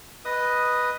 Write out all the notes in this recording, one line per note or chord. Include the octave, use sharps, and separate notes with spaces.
B4 D#5 D#6